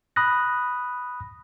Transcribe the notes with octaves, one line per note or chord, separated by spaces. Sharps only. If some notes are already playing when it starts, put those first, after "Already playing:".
B5 D#6 F#6 A#6